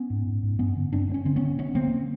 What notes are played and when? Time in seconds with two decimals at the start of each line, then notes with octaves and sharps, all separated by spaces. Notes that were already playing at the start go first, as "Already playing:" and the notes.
Already playing: B3 C#4
0.10 G#2
0.27 G#2
0.43 G#2
0.59 G2 B3 C#4
0.76 D3
0.93 G2 C4 D4
1.10 G2
1.14 C#4
1.25 D3 C4
1.36 B3 C#4
1.42 D3
1.58 D3 B3 C#4
1.75 D3 A#3 C4